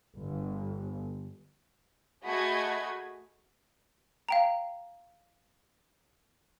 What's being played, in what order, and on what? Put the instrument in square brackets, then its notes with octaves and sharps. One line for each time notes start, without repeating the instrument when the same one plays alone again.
[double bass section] G1
[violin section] A3 F#4 G#4 D#5 B5 G#6
[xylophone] F5 G5 A#5